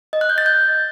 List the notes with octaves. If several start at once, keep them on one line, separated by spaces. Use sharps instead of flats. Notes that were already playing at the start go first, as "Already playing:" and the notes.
D#5
F#6
G6
A6
G6